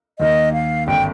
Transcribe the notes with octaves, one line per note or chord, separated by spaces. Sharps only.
D#2 D#3 A#3 D#5
F5
G#1 G2 D3 G5